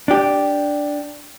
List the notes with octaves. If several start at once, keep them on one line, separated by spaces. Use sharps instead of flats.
D4 G4